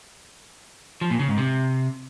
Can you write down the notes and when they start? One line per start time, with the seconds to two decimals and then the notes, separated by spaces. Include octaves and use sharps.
1.01 F3
1.10 A#2
1.19 C#3
1.28 G#2
1.37 C3